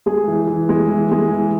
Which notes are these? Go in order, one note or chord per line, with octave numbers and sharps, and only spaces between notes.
G#3 G#4
E3
E3
G#3
E3
G#3
E3